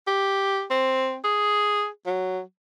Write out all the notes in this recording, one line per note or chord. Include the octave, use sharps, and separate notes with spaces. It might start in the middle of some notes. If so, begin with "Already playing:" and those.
G4
C4
G#4
F#3